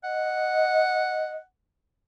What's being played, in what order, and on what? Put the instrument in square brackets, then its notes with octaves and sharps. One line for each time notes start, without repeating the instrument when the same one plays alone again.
[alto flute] D#5 [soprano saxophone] F#5